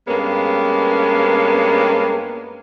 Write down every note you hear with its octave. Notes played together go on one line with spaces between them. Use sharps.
G2 G#3 A#3 B3 C#4